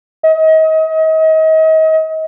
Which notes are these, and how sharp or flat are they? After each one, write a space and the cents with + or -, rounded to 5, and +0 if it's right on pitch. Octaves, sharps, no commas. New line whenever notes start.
D#5 +35